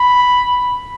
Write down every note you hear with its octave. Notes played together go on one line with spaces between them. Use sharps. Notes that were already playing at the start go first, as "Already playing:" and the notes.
Already playing: B5